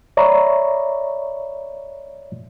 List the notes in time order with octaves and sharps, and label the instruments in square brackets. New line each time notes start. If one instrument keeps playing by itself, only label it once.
[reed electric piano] C#5 D5 E5 A#5 B5 C#6